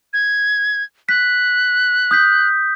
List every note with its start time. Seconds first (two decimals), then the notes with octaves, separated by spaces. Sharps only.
0.13 G#6
1.09 F#6 B6
2.11 D#6 G6 B6